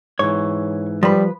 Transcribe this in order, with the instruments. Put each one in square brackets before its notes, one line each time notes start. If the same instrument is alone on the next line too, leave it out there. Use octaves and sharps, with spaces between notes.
[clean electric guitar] G#2 E3 [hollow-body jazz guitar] C#5
[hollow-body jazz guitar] F3 B4 [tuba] G3